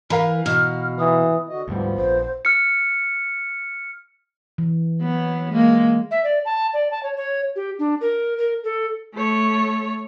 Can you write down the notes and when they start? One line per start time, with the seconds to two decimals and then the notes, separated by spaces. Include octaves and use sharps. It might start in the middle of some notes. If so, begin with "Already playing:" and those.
0.10 E3 A#4 F5 A#5 B5
0.46 B2 F6
0.99 E3 D#6
1.49 D3 F#4 D#5
1.68 D2 G#2 F3 G3 B3
1.97 A#1 C5
2.45 F6 C#7
4.58 E3
5.01 F#3 B3
5.50 G#3 A#3
6.11 E5
6.24 D5
6.45 A5
6.74 D5
6.91 A5
7.03 C#5
7.16 C#5
7.56 G4
7.79 D4
8.01 A#4
8.38 A#4
8.64 A4
9.14 A3 C#5